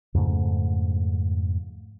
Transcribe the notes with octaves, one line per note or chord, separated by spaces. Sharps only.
F2 G#2 C#3 A3